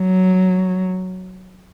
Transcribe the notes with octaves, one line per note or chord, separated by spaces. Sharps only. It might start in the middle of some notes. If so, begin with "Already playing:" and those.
Already playing: F#3